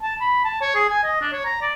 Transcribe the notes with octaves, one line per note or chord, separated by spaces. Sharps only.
A5
B5
A5
C#5
G#4
G#5
D#5
D4
C#5
A#5
D5